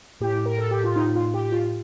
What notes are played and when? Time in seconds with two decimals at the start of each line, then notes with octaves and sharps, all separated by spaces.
0.21 A2 G4
0.46 A#4
0.59 A4
0.71 G4
0.84 F4
0.96 A2 D#4
1.15 F4
1.34 G4
1.45 G4
1.52 F4